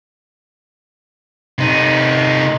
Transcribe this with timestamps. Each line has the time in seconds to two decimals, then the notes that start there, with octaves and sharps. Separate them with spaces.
1.58 C3 D#4